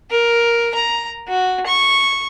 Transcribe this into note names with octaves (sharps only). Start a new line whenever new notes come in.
A#4
A#5
F#4
C#6